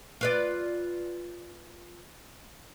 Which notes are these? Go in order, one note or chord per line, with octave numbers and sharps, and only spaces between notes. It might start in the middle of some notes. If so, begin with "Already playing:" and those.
F4 B4 D5